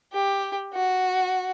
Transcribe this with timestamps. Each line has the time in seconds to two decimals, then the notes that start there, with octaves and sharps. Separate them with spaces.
0.13 G4
0.74 F#4